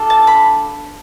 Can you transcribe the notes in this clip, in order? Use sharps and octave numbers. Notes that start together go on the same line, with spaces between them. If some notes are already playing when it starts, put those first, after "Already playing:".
Already playing: D4 F4 A4
A5
B5